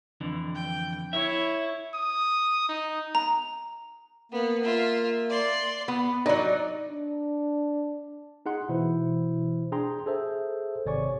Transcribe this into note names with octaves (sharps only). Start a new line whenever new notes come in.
F2 D3 E3
G5
E4 C#5 E5
D#6
D#4
A#5
A#3 B3
F4 E5
D5 C6
B3
F#3 D#4 D5
D4
D#4 G#4 F#5 C6
B2 E3 E4 C5
D4 G#4 G5 A#5 C6
G#4 A4 C5 E5
G#1 C3 C#5 D5 G#5 C#6